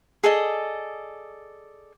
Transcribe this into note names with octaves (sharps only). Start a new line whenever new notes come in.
G#4 A4 D5 D#5